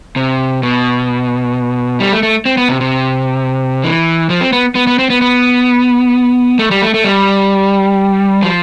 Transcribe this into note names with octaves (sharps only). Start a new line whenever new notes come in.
C3
B2
G3
A3
A3
C4
B3
C3
C3
E3
F3
C4
B3
B3
B3
C4
B3
B3
A3
G3
A3
A3
G3
F3